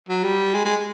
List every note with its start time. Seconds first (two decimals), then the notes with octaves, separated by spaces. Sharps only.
0.09 F#3
0.24 G3
0.54 G#3
0.65 G#3